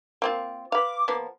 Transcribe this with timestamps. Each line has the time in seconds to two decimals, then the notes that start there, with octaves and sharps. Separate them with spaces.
0.22 A#3 C4 F4
0.72 B4 F5 D6
1.08 F3 A#3 B3